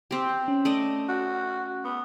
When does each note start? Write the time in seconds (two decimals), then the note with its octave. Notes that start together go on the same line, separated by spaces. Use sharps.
0.11 C4 G4
0.48 C#4
0.65 A3 D5 D#5
1.09 F#4
1.84 B3